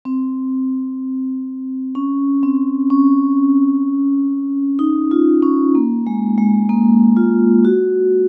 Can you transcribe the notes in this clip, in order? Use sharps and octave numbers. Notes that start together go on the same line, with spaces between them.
C4
C#4
C4
C#4
D#4
F4
C#4
A#3
G#3
G#3
A#3
F4
F#4